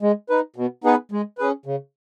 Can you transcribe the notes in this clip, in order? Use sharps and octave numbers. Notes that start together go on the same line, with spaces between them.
G#3
D#4 B4
B2
B3 D#4 G#4 B4
G#3
C#4 G#4 B4
C#3